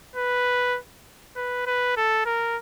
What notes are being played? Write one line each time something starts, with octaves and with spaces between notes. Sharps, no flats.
B4
B4
B4
A4
A#4